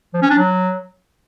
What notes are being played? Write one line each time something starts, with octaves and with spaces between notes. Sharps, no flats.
F3
C#4
D4
F#3